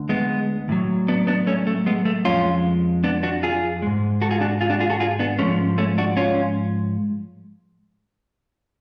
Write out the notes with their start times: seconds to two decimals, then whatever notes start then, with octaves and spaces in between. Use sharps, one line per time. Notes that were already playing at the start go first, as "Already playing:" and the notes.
Already playing: D2 D3
0.09 G#3 B3
0.69 A2 F#3
1.08 B3 D4
1.27 B3 D4
1.47 A3 C#4
1.67 A3
1.86 G#3 B3
2.05 A3
2.25 F2 F3 G#3 C#4 F4
3.04 B3 D4
3.23 D4 F#4
3.43 F4 G#4
3.82 G#2 G#3
4.21 F#4 A4
4.31 F4 G#4
4.41 D4 F#4
4.61 F4 G#4
4.70 D4 F#4
4.80 F4 G#4
4.90 F#4 A4
5.00 F4 G#4
5.19 B3 D4
5.39 G#2 F3 G#3 A3 C#4
5.78 A3 C#4
5.98 D4 F#4
6.17 C#4 F4